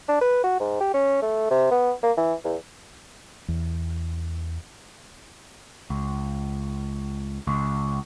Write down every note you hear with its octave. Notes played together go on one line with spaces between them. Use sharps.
D4
B4
F#4
G#2
G4
C#4
A3
C3
B3
A#3
E3
E2
E2
C#2
C#2